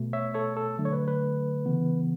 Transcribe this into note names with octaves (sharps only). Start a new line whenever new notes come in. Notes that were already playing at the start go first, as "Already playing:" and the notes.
Already playing: B2 A3
C#5 E5
A4 C#5
A4
D3 F#3 A3
C#5
B4
B4
C#3 E3 B3